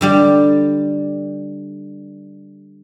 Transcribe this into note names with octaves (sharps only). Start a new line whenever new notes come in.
D3 G3 G4